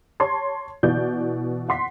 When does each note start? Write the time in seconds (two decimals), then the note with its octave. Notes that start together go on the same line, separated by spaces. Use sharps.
0.20 C#5 A5 C6 G#6
0.83 B2 E3 D5 G6
1.68 F#5 C6 B6